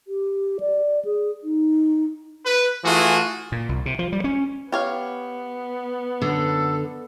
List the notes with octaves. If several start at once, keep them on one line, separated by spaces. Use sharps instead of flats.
G4
D5
G#4
D#4
B4
E3 A3 F4 F#4 G#4
A#2
C2
C3
F3
G3
C#4
B3 G4 C#5 F5
F#2 D3 A4